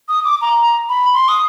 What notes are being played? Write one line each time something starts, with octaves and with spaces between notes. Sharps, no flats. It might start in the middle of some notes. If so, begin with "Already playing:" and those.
D#6
D6
A#5
B5
C6
D#6